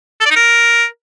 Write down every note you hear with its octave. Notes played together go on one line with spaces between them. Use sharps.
A4
D5
D#4
A#4